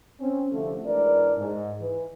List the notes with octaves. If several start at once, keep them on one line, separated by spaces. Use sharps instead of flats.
C4 C#4
C2 D3 F3 A3
G#2 E3 D4 A#4 D5
G#2
E3